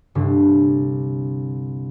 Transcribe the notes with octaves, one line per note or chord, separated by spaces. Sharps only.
C2 G2 D3